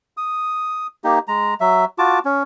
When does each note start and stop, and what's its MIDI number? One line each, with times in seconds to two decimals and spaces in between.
0.17 0.87 87
1.04 1.19 58
1.04 1.19 63
1.04 1.19 67
1.28 1.54 56
1.28 1.54 82
1.61 1.85 54
1.61 1.85 76
1.98 2.19 65
1.98 2.19 66
1.98 2.19 81
1.98 2.19 86
2.25 2.43 61